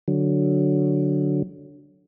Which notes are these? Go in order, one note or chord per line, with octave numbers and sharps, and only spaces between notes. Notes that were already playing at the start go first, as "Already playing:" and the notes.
D3 F#3